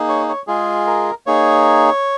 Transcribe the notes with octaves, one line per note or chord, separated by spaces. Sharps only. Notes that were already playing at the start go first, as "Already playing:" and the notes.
Already playing: A#3 D#4 G#4
C#5
C#5
G#3 F4 G#4
A#4
A#3 D#4 G#4 C#5